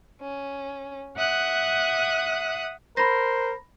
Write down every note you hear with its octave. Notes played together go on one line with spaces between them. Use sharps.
C#4
E5 F#5 D#6 F#6
A#4 C5 B5 A#6